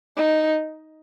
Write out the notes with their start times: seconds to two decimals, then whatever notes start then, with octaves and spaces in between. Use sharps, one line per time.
0.17 D#4